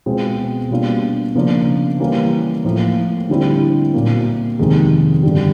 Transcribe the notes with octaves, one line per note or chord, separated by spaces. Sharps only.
B2 G#3 C4 F4
B2 G3 A#3 D4 F4
C#3 F3 A#3 D4 F4
E3 G3 A#3 C#4
A2 F3 A#3
D3 G3 C4 E4
A#2 F#3 A#3
F2 C3 D#3 G#3
G2 D3 G3